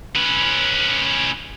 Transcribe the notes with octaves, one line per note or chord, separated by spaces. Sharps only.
C#4 B4